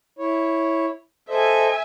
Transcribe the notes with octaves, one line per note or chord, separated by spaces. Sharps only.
E4 C#5
A4 C5 D#5 E5 G#5